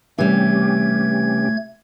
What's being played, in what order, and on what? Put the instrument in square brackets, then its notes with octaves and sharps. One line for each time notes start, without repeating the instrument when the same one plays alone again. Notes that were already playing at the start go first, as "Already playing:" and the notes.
[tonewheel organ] C3 C#4 G4 [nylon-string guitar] E3 G3 [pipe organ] A3 G#6